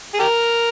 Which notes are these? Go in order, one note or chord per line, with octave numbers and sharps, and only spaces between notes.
G#4
G4 A#4